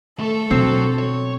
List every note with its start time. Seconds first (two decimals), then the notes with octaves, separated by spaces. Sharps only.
0.20 A3 A4
0.51 B2 F#3 C4
0.99 C#5